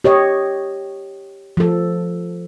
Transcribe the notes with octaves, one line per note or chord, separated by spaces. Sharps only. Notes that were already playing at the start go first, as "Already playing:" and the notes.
G4 C#5 D#5
F3 A4